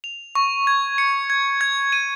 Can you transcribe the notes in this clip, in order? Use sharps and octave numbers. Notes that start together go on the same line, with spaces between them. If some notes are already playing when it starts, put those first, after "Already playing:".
F7
C#6
G#6
C#7
G#6
G#6
D#7